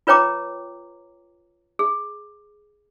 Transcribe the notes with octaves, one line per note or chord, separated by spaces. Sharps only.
F4 B4 C#5 G5 A#5 D6
G#4